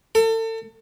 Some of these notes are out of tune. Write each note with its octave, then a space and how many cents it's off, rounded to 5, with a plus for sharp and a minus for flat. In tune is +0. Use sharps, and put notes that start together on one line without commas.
A4 +35